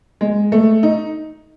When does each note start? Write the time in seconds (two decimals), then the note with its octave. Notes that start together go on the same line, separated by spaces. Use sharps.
0.21 G#3
0.52 A3
0.83 D#4